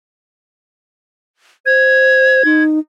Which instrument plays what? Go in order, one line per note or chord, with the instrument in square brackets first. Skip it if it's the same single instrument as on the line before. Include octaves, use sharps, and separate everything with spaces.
[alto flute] C5 [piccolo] G#6
[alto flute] D#4